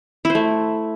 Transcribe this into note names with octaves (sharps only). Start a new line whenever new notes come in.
E4
C5
A3